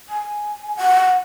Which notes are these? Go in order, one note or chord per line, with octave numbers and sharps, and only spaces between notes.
G#5
F#5